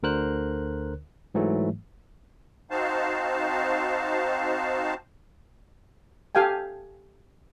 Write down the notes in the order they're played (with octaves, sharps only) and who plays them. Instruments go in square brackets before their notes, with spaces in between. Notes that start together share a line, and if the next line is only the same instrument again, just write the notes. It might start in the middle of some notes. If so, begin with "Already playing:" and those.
[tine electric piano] D2 D3 A#4 C5 F#6
G#2 E3 F#3 A3
[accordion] C4 D#4 F#4 C5 F5 A5
[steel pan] G4 A4 F5 G5 G#5